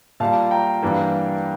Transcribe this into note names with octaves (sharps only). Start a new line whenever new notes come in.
A#2 G3 A#3 F5 A5
G5 A#5
G2 E3 G3 A#3